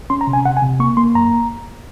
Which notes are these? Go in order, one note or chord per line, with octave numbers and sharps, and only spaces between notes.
C#4 C6
A#5
C3
G#5
C3 F#5
G#5
C3
A#3 C#6
A#3 C6
F#2 A#5